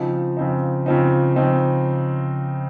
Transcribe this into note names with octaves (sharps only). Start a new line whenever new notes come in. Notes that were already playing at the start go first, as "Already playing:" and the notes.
Already playing: C#3 F3 C4 D#4
C#3 F3 C4 D#4
C#3 F3 C4 D#4
C#3 F3 C4 D#4